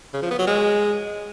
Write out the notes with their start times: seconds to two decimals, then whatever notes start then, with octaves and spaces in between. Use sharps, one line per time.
0.14 C#3
0.22 F3
0.30 B3
0.39 F#3
0.47 G#3